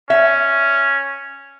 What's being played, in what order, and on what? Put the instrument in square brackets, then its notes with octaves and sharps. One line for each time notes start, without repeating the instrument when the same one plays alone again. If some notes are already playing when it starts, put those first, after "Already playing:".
[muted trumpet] C#4 [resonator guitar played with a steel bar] E5